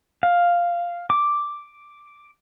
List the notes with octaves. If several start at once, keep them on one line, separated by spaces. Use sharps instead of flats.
F5
D6